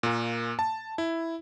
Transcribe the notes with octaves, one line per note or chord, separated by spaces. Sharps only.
A#2 A#3
A5
E4